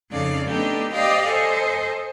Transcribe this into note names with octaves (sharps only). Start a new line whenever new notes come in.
F2 C#3 D#4 A4 D5 F5
A3 B3 D4 D#4 G4 A4
G4 C5 D5 D#5 F5 G5
A4 C5 D#5 G#5